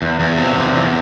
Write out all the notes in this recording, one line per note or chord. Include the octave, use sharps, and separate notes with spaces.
E2
E2
C3
E2
E2